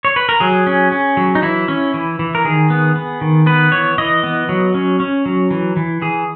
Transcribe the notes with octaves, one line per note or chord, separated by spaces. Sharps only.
C#5
B4
A#4
F#3 G#4
C#4
C#4
F#3
D#4
E3 E4
C#4
E3
E3
A#4
D#3 G#4
B3
B3
D#3
B3 B4
E3 C#5
E3 D#5
B3
F#3
C#4
C#4
F#3
E3
E3
E3 G#4